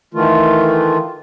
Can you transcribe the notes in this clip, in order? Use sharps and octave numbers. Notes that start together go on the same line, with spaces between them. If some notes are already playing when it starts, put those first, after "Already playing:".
D#3 E3 A3 F4